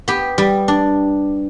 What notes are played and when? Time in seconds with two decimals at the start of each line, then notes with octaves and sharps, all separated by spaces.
0.08 B3 G4
0.38 G3
0.68 D4